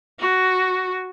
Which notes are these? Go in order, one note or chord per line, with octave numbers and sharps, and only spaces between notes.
F#4